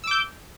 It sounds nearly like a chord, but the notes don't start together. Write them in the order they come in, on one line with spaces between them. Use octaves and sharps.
E6 D6 G6